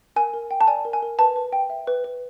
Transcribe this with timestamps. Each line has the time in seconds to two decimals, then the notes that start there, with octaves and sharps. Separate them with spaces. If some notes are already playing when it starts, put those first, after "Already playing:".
0.16 A#4 G#5
0.34 A#4
0.51 G5
0.61 A5
0.67 D5 G#5
0.85 A#4
0.93 G#5
1.02 A#4
1.19 B4 A5
1.36 B4
1.53 G5
1.70 E5
1.87 B4
2.04 B4